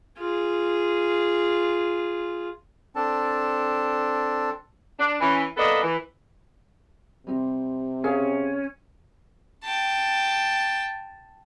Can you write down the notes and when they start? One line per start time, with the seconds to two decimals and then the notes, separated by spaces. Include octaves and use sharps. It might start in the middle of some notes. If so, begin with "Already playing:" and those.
0.18 F4 G#4
2.96 C4 D4 A4 A5
4.99 D4
5.21 E3 C#4
5.57 A#3 B3 D4 A4 B4 D#5
5.82 E3
7.27 C3 G3 C4
8.04 C#4 G#4 F5
9.64 G5 A5